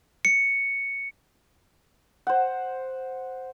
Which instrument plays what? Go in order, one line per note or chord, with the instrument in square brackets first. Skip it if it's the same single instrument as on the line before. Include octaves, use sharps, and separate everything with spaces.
[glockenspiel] C#7
[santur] C5 F#5